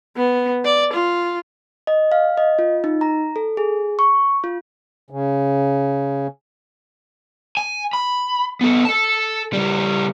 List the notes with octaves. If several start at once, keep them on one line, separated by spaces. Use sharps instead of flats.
B3
D5
F4
D#5
F5
D#5
F4
D#4
A#5
A4
G#4
C#6
F4
C#3
G#5
B5
B3 A4
A4 A5
C#3 G3